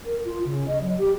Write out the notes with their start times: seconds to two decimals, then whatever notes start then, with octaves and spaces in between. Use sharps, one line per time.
0.06 A#4
0.25 F4
0.45 C#3
0.68 D#5
0.81 F#3
0.98 G4